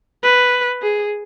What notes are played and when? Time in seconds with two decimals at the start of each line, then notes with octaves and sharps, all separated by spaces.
0.23 B4
0.82 G#4